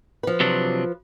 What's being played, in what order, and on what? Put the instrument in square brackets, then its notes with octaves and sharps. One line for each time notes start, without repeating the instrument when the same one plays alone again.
[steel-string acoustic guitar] F3 B4
[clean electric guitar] C3 F#3 D4